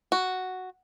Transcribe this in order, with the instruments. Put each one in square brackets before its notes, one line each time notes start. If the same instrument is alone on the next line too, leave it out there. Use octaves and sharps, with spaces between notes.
[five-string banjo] F#4